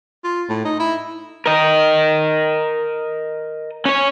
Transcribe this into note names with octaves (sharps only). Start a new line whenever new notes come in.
F4
A2
D#4
E4
A#4 D#5
C#4 C#5